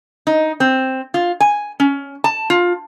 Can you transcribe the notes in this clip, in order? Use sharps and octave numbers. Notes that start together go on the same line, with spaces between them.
D#4
C4
F4
G#5
C#4
A5
F4